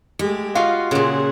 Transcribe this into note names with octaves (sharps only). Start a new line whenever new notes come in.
G#3 A3 G4
F4 F#4 D#5 F5
A#2 C#3 G#4 F#5